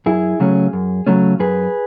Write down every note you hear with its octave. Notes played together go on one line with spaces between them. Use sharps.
F#2 E4 G#4
C#3 F#3 A3 C#4
F#2
C#3 F#3 A3 C#4
F#2 G#4 B4